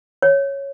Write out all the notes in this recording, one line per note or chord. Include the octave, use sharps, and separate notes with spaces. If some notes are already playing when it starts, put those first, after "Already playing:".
C#5